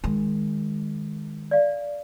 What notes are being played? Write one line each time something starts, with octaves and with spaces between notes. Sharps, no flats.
D#3 G#3
D5 F5